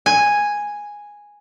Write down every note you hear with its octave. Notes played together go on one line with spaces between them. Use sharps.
G#5